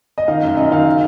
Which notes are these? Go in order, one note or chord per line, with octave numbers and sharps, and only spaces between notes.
D#5
D#3 F5
F#2
F#2 D#5
D#3 F5
C#3